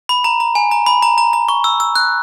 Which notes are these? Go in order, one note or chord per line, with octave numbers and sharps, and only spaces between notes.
B5
A#5
A#5
G#5
A#5
B5
A#5
A#5
A#5
C#6
E6
E6
F#6